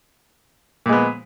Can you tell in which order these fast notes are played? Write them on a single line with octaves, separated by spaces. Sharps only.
A#2 G#3 B3